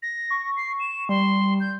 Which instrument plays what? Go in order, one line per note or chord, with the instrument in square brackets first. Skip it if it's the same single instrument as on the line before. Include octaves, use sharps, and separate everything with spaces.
[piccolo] A#6
[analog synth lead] C#6
[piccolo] C7
E7
[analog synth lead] G3 [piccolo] C6
[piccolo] G6